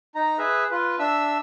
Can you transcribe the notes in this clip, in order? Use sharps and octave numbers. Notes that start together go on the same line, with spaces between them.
D#4 A#5
G#4 B4 E5
F4 B4
D4 E5 E6